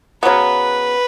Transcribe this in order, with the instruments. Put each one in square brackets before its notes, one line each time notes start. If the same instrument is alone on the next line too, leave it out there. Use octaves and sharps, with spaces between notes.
[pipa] C#3 F#3 B3 [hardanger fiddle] B4